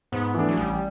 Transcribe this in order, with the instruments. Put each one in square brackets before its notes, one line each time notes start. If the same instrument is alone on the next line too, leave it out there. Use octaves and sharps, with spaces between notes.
[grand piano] G#2 [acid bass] B3
[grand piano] E3 A3 D4
[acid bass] F#3
[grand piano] A1 [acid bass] G3